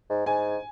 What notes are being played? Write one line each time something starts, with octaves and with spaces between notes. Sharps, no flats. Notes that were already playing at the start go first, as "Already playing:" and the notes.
G#2
G#2 G#5